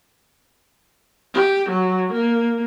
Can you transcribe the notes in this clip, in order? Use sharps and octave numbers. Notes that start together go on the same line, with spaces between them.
G4
F#3
A#3